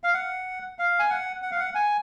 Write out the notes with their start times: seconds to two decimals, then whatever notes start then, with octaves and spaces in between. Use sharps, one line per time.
0.04 F5
0.14 F#5
0.79 F5
0.99 G#5
1.10 F#5
1.42 F#5
1.51 F5
1.60 F#5
1.75 G#5